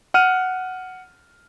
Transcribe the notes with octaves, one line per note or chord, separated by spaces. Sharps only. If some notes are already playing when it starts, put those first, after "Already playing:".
F#5 F6 D#7